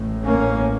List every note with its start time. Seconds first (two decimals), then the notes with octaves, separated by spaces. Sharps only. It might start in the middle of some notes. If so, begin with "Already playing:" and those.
Already playing: A1 A2
0.25 A#3 C#4